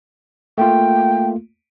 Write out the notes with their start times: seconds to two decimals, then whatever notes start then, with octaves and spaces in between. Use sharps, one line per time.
0.58 A3 A#3 F4 G5